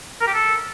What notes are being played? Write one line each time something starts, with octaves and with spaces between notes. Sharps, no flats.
A#4
G4
A4